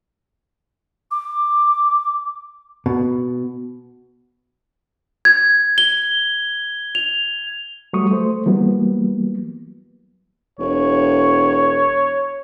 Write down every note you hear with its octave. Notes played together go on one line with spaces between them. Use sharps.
D6
B2
G#6
G7
F7
F#3 G3 A3 C#6 D#6
A3 C5
E3 F#3 G3 A#3 B3
E1 C#5